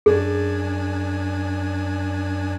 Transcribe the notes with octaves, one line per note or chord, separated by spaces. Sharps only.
F#2 D4 G#4 G#5